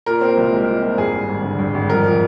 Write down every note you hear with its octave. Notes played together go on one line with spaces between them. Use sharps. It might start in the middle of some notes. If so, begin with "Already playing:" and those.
A#2 A#4
C4
C2
G#3
A#2
C4
G2 G#4
G#1
G#1
D3
G2
G#1
F2 A#4
F3